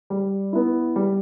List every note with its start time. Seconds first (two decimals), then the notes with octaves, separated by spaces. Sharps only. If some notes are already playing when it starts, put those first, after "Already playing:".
0.10 G3
0.53 B3 E4
0.96 G3